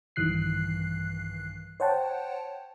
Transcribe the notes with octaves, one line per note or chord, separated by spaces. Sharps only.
A#1 G2 D#3 E3 F#6 C7
C5 C#5 F#5 G5 A5